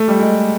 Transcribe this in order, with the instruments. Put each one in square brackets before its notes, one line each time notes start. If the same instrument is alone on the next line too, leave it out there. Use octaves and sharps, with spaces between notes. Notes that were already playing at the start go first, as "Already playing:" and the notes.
Already playing: [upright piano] A3
G3
G#3